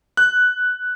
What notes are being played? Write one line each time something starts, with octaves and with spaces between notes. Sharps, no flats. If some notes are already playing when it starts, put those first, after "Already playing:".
F#6